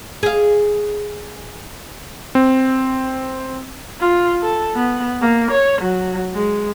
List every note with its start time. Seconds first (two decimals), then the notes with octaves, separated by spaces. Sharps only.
0.23 G#4 F5
2.35 C4
4.01 F4
4.43 A4
4.75 B3
5.22 A#3
5.52 C#5
5.82 F#3
6.34 G#3